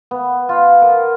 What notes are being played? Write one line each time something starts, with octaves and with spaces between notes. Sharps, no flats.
B3
F4
A#4